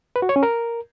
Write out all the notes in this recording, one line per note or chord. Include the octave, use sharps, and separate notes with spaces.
B4
F#4
C#5
C#4
A#4